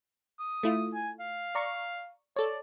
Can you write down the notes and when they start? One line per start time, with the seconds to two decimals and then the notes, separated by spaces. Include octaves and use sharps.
0.39 D#6
0.63 A3 E4 F4
0.94 G#5
1.20 F5
1.55 D5 A#5 C#6
2.36 A4 C#5 D5